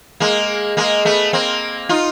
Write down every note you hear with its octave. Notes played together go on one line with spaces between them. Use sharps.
G#3 A#3
G#3 A#3
A3 B3
A#3 C4
D#4 F4